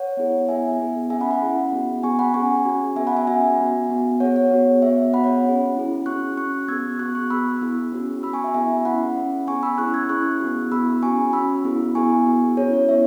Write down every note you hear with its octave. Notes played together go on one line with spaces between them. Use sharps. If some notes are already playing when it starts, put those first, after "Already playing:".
Already playing: C#5 F#5
B3 E4 G#4
B3 E4 G#4 E5 G#5
B3 G#4
C#4 G#4 E5 G#5
F#5 B5
F#5 B5
C#4 E4 G#4
B3 F#4
B3 G#4 G#5 C#6
F#5 B5
C#4 G#4 G#5 C#6
C#4 F#4
B3 G#4 E5 G#5
F#5 B5
E5 G#5
C#4 F#4 E5 G#5
B3 F#4
B3 F#4
B3 G#4 C#5 F#5
C#5
B3 F#4
B3 G#4 E5
B3 F#4 F#5 B5
C#5 F#5
C#4 G#4
C#4 E4 G#4
C#4 F#4 C#6 F#6
C#4 F#4 C#6 F#6
B3 G#4 E6 G#6
B3 F#4 C#6 F#6
C#6 F#6
B3 G#4 B5 E6
B3 E4 G#4
C#4 F#4
B3 F#4 B5 E6
G#5 C#6
E5
B3 E4 G#4 E5 G#5
C#4 E4 G#4 F#5 B5
C#4 G#4
B3 G#4 G#5 C#6
B5 E6
C#4 E4 G#4 C#6 F#6
E6 G#6
C#4 E4 G#4 C#6 F#6
B3 F#4
B3 E4 G#4 B5 E6
C#4 F#4 G#5 C#6
C#4 F#4 B5 E6
B3 E4 G#4
B3 E4 G#4 G#5 C#6
B3 F#4
C#4 E4 G#4 C#5
C#5
B3 E4 G#4 E5